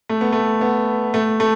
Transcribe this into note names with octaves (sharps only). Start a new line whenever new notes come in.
A3
B3
A3
B3
A3
A3